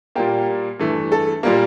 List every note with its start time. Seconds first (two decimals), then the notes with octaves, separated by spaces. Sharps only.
0.15 A#2 G3 A#3 G4
0.80 G2 E3 A3
1.12 A4
1.43 A#2 G3 A#3